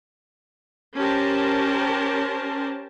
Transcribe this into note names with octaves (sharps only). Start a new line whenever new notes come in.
C#4 G4 A#4 C5 A5